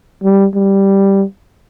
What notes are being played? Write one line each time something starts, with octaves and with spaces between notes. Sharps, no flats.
G3
G3